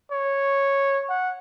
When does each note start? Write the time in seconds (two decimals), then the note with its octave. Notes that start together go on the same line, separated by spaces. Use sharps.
0.11 C#5
1.09 F#5